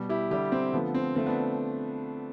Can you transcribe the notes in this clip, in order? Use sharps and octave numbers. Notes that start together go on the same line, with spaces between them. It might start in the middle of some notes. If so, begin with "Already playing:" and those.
Already playing: B2 G3
E4 G4
D3 G3 E4 G4
C4
D3 F3 A3 B3
C4
D3 F3 A3 C4
B3 D4